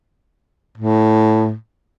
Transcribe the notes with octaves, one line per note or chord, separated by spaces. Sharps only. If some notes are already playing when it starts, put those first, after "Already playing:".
A2